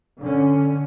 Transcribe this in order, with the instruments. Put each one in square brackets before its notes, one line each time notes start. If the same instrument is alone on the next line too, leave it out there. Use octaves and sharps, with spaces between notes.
[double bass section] D3 C#4